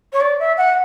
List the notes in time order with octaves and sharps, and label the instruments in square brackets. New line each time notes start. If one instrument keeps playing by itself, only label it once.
[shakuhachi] C#5
D5
E5
F#5